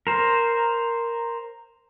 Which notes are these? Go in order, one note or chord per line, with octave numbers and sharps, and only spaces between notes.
A#4 C5